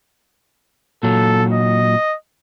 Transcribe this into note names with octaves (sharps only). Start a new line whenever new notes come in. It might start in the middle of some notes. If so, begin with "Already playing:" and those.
A#2 F#3 A4
D#5